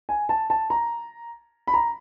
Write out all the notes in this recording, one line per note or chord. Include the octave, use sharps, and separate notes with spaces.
G#5
A5
A5
A#5
B5
A#5